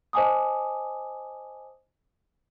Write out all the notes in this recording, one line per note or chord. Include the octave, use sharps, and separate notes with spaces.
C5 D#5 G#5 A5 D6 D#6